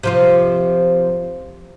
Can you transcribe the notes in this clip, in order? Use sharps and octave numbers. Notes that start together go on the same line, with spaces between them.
C3 F3 F4